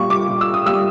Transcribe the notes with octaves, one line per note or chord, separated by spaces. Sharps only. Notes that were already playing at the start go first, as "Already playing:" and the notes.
Already playing: A#2 G3 A#3 C#6
D6
A#2
E6
D#6
G3 A#3 E6